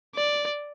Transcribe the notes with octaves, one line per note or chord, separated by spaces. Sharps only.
D5